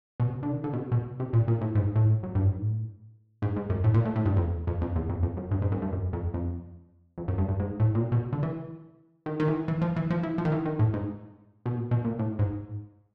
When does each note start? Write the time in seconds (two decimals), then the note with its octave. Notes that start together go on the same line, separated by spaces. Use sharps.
0.20 B2
0.27 C3
0.35 C#3
0.43 D3
0.50 D#3
0.64 D3
0.73 B2
0.77 C3
0.92 B2
1.20 C3
1.33 A#2
1.48 A#2
1.61 A2
1.75 G#2
1.96 A2
2.23 F#2
2.35 G2
2.47 G#2
2.59 A2
3.42 G#2
3.56 G#2
3.70 F#2
3.84 A2
3.94 A#2
4.05 A2
4.16 A2
4.26 G2
4.37 F2
4.46 E2
4.67 F2
4.81 F2
4.96 E2
5.09 F2
5.23 F2
5.37 F#2
5.51 G2
5.62 G#2
5.72 F#2
5.82 G2
5.92 F#2
6.13 F2
6.34 F2
7.18 F2
7.28 F#2
7.38 G2
7.48 G2
7.60 G#2
7.80 A2
7.95 A#2
8.02 B2
8.12 B2
8.33 D3
8.43 E3
9.26 D#3
9.40 D#3
9.48 E3
9.68 E3
9.82 F3
9.96 E3
10.10 F3
10.23 E3
10.38 F3
10.45 D#3
10.52 E3
10.66 D#3
10.79 A2
10.94 G#2
11.66 B2
11.77 A#2
11.91 B2
12.04 A#2
12.19 A2
12.39 G#2